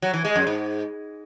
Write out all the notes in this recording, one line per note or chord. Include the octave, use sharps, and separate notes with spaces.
F#3
E3
G#3
F#2
G#2